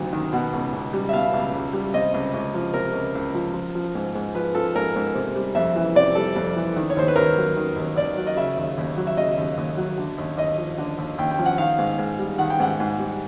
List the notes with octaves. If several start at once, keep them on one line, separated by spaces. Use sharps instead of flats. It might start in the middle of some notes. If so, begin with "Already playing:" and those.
Already playing: D2 C3 D#3 F#3
D#3
B2 F#5
C#2
C#2
G3
E5
B2 F5
C#2
C#2
G3
C3 D#5
C#2
C#2
F3
C3 A#4
C#2
C#2
F3
F3
F3
G#2
G#2
F3 B4
F3 A4
G#2 A#4
G#2
C3
G3
F2 E5
E3
C3 D5
G3 A4
F2
E3
D#3
C#5
D#2 C5
B4
D#2 A#4
F#3
D#3
D#2
D#2 D5
F#3
D#5
C#3 E5
D#2
D#2
F#3
E5
C#3 D#5
D#2
D#2
F#3
D3
D#2
D#2 D#5
F3
D3
D#2
D#2 G5
G5
F3
F#5
D#3 F5
G#2
G#2
G3
D#3 F#5
G5
G#2 F#5
G#2
G3